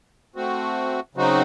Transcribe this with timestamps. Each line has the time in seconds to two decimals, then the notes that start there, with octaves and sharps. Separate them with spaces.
0.36 A3 C4 F#4
1.15 C#3 F#3 C4 D#4 F#4